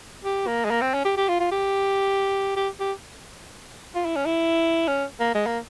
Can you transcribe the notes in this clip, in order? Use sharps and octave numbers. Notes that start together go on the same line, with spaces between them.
G4
A#3
G#3
A#3
C4
C#4
G4
G4
F4
F4
G4
G4
G4
F4
E4
C#4
E4
C#4
A#3
G#3
A#3